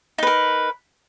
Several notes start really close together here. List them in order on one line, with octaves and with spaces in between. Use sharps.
D#4 B4 A#4